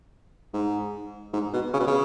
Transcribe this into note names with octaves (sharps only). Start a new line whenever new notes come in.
G#2
G#2
B2
C#3
B2
C#3